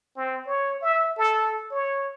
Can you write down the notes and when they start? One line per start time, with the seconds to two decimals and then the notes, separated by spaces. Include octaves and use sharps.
0.17 C4
0.47 C#5
0.82 E5
1.18 A4
1.71 C#5